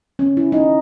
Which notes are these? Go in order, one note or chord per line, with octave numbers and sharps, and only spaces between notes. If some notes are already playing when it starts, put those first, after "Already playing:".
C#4
E4
D#4